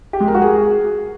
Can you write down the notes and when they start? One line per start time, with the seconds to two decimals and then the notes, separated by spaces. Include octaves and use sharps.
0.13 G4
0.20 G#3
0.27 A#4
0.35 F#4
0.42 G#4